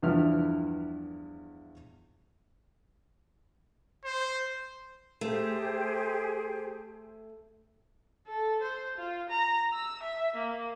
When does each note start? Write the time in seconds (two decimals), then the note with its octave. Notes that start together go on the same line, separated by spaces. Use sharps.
0.02 E2 G2 F3 E4 B4 F6
4.04 C5
5.21 A3 G4 G#4 C5
8.27 A4
8.62 C5
8.97 F4
9.30 A#5
9.73 E6
10.03 E5
10.35 A#3